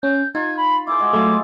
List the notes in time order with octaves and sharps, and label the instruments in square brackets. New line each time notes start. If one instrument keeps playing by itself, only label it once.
[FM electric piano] C#4 [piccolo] G6
[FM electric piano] D#4 [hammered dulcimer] F4 [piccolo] G#6
[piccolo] B5
[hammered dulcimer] E4 G#4 C5 [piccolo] D6
[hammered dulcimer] F3 G#3 F#4
[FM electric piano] F#3 A3 [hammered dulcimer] E4 F4